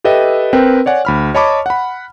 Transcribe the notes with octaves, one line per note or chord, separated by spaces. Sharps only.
G4 A4 B4 D#5 E5 G5
C4 A#4 B4 G5
C#5 D5 F#5 G#5
D2 B5 F6
C#5 D#5 A5 B5 C#6 D6
F#5 B5